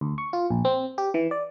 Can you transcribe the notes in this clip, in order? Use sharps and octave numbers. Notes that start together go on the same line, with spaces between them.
D2
C#6
F4
A#1
C4
G4
E3
D5